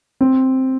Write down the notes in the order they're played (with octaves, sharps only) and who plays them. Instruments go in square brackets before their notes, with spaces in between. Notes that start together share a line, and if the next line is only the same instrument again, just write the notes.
[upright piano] C4